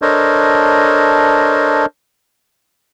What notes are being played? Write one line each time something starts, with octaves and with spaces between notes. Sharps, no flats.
D4 A4 A#4 C5 C#5 D#5